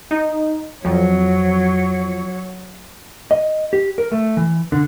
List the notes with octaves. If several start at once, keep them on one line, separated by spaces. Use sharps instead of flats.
D#4
F2 F3 F#3 C#5
D#5
G4
A#4
A3
E3
D3